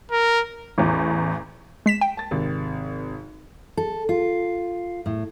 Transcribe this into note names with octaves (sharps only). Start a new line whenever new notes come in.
A#4
A1 E2
G#3 B6 E7
G5
A5 A6
G#1 C3
A4
F4
A2